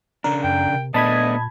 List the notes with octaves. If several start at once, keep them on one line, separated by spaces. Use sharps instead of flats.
C#3 D4 A#4
F#2 G5
C3
A#2 A3 B3 D4 D#5 A5 B5 G#6